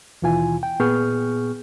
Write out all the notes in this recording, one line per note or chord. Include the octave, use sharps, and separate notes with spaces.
D#2 B2 E3 F4 G#5
G5
A#2 B3 G#4 C#6 F6 G6